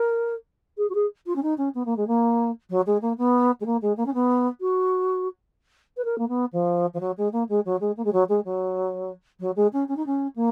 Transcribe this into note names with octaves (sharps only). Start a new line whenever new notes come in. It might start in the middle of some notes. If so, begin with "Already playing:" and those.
Already playing: A#4
G#4
F#4
G#4
F4
C#4
D#4
C#4
B3
A#3
G#3
A#3
F#3
G#3
A#3
B3
G#3
A#3
G#3
A#3
C#4
B3
F#4
B4
A#4
A#3
B3
F3
F3
F#3
G#3
A#3
G#3
F#3
G#3
A#3
G#3
F#3
G#3
F#3
F#3
G#3
C#4
C#4
D#4
C#4
A#3